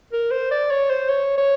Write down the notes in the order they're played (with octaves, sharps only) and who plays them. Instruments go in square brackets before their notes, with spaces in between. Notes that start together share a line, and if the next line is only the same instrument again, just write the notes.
[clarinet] A#4
C5
D5
C#5
C5
C#5
C#5